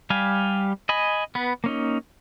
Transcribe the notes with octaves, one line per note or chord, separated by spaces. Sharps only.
G3 G4 F5 G#5
D#5 G#5 B5
B3 B4
A#3 C#4 D#4